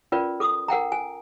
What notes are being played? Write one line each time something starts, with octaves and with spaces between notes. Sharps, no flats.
C#4 F4 A#4 B4 D5
A4 D6 D#6
A#4 F#5 G5 A#5
G#5